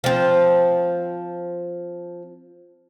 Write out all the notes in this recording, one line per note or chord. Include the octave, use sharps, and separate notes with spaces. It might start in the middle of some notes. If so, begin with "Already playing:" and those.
F3 C4